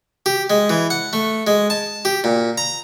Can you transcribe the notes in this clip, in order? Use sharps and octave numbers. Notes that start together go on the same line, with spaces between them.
G4
G#3
E3
F#5
A3
G#3
A5
G4
A#2
A#5